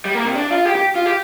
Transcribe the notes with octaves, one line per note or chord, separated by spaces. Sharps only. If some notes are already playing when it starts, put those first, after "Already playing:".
G3
A#3
C3
D4
F4
G4
G4
F4
G4